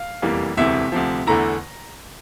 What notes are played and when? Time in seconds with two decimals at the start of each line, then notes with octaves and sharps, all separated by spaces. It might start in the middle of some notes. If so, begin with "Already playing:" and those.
Already playing: F5
0.22 F1 E2 E3 G3 A#3
0.57 E1 D2 C3 E3 A3 E5
0.92 D2 C3 F3
1.27 E2 D3 A3 E4 A#5